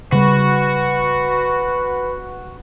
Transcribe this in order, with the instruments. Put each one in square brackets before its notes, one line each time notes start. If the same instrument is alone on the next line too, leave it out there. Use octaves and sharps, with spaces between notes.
[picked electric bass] C#3 G3 [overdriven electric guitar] F#4 [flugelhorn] B4